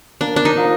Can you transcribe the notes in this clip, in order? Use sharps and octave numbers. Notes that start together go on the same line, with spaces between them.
A#3 D4
D4
D#4
F3